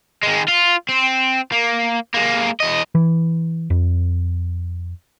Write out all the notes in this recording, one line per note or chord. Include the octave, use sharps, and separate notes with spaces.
D#3 G#3
F4
C4
A#3
G#3 A#3
E2 D#5
E3
F2